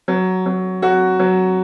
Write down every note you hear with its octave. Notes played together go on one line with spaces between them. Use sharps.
F#3
F#3
F#3 F#4
F#3